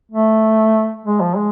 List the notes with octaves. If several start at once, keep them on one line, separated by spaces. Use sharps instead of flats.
A3
G#3
F3
G#3